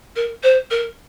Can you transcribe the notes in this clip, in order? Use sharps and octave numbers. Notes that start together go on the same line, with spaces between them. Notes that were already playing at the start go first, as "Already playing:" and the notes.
A#4
C5
A#4